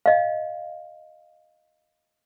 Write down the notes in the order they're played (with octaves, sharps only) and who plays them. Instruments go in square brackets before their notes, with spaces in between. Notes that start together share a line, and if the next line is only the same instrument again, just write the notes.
[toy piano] D#5 F5